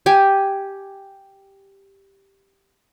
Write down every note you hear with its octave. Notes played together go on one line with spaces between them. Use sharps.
G4 G#5